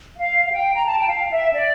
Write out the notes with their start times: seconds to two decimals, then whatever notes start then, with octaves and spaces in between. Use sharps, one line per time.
0.17 F5
0.45 F5
0.51 G5
0.75 A#5
0.86 A5
0.99 G5
1.08 F5
1.31 E5
1.53 D5